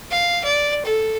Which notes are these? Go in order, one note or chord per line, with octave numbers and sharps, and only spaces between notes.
F5
D5
A4